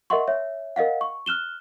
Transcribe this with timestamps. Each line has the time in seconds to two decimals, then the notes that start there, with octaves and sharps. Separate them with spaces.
0.10 A#4 D#5 E5 F#5 C6 C#6
0.28 C#5 E5
0.76 A#4 D#5 F5 F#5
1.01 C#6
1.26 F6 F#6 E7 G7